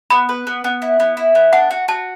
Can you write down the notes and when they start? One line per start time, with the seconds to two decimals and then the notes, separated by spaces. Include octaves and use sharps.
0.10 B3 B5
0.29 B4
0.47 B3
0.64 B3
0.82 E4
1.00 B3
1.17 E4
1.35 B3
1.53 D4 F#5
1.71 F#4
1.88 F#4 A5